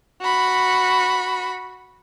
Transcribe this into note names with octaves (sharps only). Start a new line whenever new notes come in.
F#4 B5